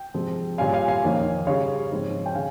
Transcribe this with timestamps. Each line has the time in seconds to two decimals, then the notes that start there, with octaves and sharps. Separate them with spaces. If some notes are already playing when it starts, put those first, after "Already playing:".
Already playing: G5
0.14 C3 F3 G#3 C4
0.58 A#2 G3 C#4 F5 G#5
0.74 F5 G#5
0.88 F5 G#5
1.02 F2 D#3 A#3 C#4
1.47 C#3 G3 C#4 C#5 F5
1.91 G#2 F3 C4
2.26 G5
2.35 C#3 F5 G#5